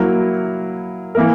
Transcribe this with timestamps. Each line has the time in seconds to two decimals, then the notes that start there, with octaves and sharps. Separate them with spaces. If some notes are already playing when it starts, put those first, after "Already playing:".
Already playing: F#3 A#3 E4 A#4
1.15 E3 A#3 E4 A#4